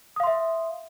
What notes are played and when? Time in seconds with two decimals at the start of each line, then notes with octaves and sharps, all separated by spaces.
0.16 D#6
0.20 F5
0.23 C6
0.27 E5